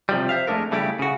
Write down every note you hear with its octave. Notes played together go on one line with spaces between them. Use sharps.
C3 F3 G3
C5 E5 F5
F2 G#3 A3 D4 A4 A#4
C#3 G3 A3 E4 F#4 G4
C#3 F#4